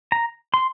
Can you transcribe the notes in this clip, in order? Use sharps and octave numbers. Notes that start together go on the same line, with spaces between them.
A#5
C6